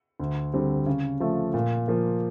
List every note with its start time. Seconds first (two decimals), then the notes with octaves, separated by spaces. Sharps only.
0.20 D2
0.53 D3 G3 C4
0.86 C#3
1.20 F3 A3
1.54 A#2
1.88 F3 A#3